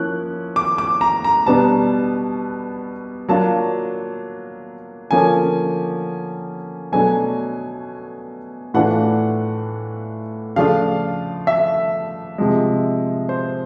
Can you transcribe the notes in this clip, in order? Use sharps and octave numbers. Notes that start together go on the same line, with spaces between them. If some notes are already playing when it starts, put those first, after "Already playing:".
Already playing: F3 A#3 C#4 E4 F#6
D6
D6
A#5
A#5
B2 G3 B3 D4 A5
F#3 A#3 D4 F4 A5
D3 F3 A#3 C#4 G#5
B2 F#3 A3 D4 G#5
A2 E3 A3 D4 F4 F#5
C#3 F3 A3 D4 F4 F5
E5
C3 F3 G#3
C5